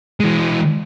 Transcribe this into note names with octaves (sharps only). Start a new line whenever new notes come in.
E3 G#3